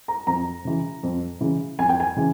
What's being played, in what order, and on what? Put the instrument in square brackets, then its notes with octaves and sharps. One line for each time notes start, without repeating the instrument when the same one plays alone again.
[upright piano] A#5
F2 A#5
C#3 E3
F2
C#3 E3
F2 G#5
G5
G#5
C#3 E3